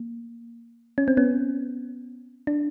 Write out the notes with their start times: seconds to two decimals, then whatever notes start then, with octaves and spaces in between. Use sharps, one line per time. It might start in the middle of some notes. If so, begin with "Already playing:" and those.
Already playing: A#3
0.98 C#4
1.08 C4
1.17 B3 C#4
2.47 D4